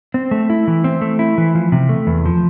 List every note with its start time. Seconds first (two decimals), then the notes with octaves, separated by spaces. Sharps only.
0.14 C4
0.31 A3
0.50 E4
0.68 E3
0.84 C4
1.02 A3
1.19 E4
1.38 E3
1.55 F3
1.72 C3
1.89 A3
2.07 E2
2.26 F3